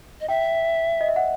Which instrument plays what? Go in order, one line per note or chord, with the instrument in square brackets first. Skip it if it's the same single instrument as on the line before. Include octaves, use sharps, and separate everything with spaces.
[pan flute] D#5
[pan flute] E5 [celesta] G5
[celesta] D#5
E5
F#5